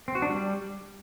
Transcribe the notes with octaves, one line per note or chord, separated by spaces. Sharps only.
C4
F#4
D4
G3